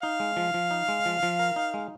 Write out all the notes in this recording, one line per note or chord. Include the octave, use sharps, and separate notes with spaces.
D#4 F5
G#3
F3
F3
D#4
G#3
F3
F3
A#4
D#4
G#3